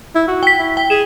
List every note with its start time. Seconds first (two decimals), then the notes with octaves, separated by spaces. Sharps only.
0.15 E4
0.28 F#4
0.43 G5 B6
0.59 E4
0.77 G5
0.90 G#4 E7